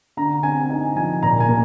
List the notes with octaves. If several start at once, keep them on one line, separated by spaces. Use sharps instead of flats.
D3 A#5
C4 G#5
D#4 G#5
F3 G#5
A#2 A#5
G#5
A#3